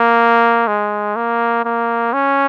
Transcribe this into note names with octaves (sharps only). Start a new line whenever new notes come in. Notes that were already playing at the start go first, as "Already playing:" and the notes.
Already playing: A#3
G#3
A#3
A#3
C#4